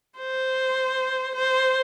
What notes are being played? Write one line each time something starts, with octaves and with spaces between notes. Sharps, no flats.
C5
C5